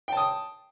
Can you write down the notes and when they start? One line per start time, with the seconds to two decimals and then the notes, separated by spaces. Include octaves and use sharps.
0.08 G5
0.12 A5
0.17 D#6